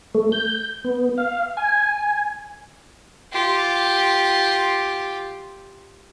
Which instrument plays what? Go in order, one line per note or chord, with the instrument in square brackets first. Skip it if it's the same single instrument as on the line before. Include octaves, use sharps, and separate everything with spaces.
[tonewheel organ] A3
G6
B3
F5
G#5
[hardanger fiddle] F4 G4